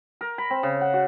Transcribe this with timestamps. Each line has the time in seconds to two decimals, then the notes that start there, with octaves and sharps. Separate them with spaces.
0.21 A#4
0.38 B5
0.50 C4
0.63 C#3
0.81 F#5
0.94 F#4